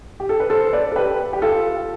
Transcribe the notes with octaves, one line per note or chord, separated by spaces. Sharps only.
G4
A4
B4
A4 C5
B4 D5
A4
G4 B4
G4
F4 A4